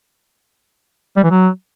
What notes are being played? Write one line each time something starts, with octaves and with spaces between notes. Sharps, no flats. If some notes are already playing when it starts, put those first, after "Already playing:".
G3
E3
F#3